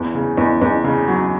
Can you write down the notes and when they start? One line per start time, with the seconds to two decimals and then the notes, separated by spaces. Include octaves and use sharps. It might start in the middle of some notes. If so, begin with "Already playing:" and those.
Already playing: E2
0.15 C#3
0.38 E2
0.62 E2
0.84 C#3
1.08 F#3